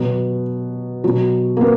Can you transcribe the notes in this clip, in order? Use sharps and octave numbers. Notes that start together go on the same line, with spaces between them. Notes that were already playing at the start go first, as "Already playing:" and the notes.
Already playing: B2 F#3 B3
B2 F#3
A#3
B3